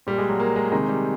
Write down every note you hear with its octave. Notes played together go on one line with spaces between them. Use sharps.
A#2 G3
G#3
F#3
A#3
G#3
C3 D#3 G#3
G3